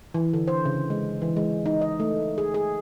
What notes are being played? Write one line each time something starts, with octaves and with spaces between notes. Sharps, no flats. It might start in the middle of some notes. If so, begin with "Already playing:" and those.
E3
D3
C5
C#3
G#3
E3
G#3
D#4
D#5
A3
G#4
G#4